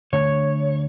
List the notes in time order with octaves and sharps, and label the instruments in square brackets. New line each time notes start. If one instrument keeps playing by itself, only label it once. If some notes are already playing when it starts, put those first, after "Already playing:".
[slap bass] D3 A3 D4 [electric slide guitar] C#5